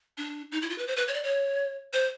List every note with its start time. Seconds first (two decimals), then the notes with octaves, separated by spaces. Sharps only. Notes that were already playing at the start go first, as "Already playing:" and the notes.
0.18 D4
0.52 D#4
0.62 E4
0.70 F4
0.78 B4
0.87 C5
0.97 B4
1.08 C#5
1.14 D5
1.24 C#5
1.93 C5